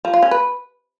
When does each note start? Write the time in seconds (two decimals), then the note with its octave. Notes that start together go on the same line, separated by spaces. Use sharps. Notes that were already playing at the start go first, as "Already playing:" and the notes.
0.05 F3
0.14 F4
0.22 C#4
0.31 B4